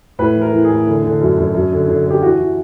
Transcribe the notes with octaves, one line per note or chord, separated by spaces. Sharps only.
A2 B4
E3
A#4
E3
G#4
A2
D3
D3
F#2
F#2
F#2
D3
D3
D3 G4
E3 F#4
E3